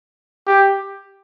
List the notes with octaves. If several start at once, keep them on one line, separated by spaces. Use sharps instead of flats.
G4